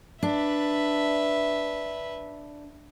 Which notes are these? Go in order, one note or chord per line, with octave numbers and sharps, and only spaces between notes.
D4 B4 E5